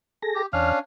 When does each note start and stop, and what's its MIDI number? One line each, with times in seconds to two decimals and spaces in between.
0.22 0.42 68
0.22 0.42 69
0.22 0.42 94
0.35 0.46 67
0.53 0.73 40
0.53 0.79 61
0.53 0.79 62
0.53 0.79 77
0.53 0.73 89